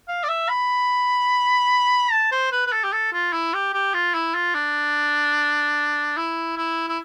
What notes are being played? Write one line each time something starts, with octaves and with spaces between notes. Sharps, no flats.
F5
D5
E5
B5
A5
C5
B4
B4
A4
G4
A4
F4
E4
G4
G4
F4
E4
F4
D4
E4
E4
E4